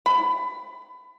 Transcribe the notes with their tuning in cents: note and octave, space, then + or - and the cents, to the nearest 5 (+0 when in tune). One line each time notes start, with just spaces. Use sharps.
B5 +20